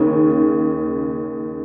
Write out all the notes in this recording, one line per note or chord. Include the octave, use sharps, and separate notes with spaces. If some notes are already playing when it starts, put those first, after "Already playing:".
Already playing: D#2 C#3